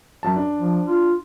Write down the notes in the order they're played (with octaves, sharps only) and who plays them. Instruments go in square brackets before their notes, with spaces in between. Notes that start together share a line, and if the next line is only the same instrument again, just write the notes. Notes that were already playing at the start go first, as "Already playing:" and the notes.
[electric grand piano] F#2 A5
D4
[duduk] F3
F4